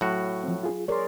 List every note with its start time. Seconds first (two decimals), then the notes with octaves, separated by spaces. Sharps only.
0.01 A2 F#3 F#4
0.44 F3 C4
0.63 F4 G#4
0.88 G#4 A#4 C#5 D5 C6